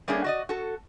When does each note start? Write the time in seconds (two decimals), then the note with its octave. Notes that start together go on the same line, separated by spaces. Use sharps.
0.08 G3 A3 A#3 C#4 D4 G#4
0.24 F#4 D5 D#5
0.49 F#4 A4